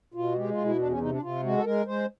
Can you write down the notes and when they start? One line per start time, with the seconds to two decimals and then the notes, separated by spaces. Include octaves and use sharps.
0.14 B2 F4
0.32 F#4
0.36 G#3 G4
0.50 F4
0.58 B2
0.64 E4
0.78 E2 D4
0.89 C#4
1.00 C3 D#4
1.11 D4
1.22 C3 F4
1.43 G#3 F#4
1.58 A4
1.64 G#3 A#4
1.86 G#3 C5